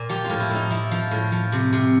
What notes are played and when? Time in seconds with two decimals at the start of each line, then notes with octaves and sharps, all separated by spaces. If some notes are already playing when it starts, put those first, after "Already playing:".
Already playing: A#2
0.09 F3 G4
0.25 A2 F4
0.40 E4
0.50 A2 D#4
0.70 F3 E4
0.91 F3
1.11 A2
1.32 F3
1.52 C3
1.73 C3